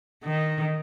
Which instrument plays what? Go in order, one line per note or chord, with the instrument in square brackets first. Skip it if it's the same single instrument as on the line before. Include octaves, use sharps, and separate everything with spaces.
[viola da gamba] D#3